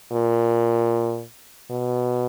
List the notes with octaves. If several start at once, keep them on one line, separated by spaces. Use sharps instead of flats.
A#2
B2